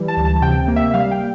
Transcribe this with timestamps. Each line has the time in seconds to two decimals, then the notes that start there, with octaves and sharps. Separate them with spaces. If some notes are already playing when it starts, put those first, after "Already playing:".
Already playing: E3 G3
0.08 A5
0.17 D2
0.25 A5
0.42 C3 G5
0.68 A#3
0.76 E5
0.94 G3 F5
1.11 G5